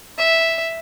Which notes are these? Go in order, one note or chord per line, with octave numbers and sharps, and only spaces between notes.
E5